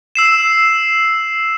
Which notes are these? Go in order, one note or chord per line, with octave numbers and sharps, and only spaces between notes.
E6 C7 E7